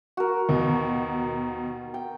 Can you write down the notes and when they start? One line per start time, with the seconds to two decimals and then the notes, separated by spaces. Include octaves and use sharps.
0.17 F#4 A#4
0.49 D#2 B2
1.94 G5